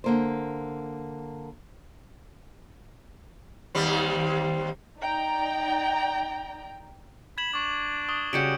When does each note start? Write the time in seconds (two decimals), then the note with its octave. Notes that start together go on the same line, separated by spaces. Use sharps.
0.04 D3 A#3 C5
3.75 D#2 G3 C4
5.02 D#4 D5 G5 A#5
7.38 B5 G#6 E7 F#7
7.54 D4 C#6 D6
8.09 C#6 D#6 G7
8.33 C#3 G3 F#4 G6 C#7 D7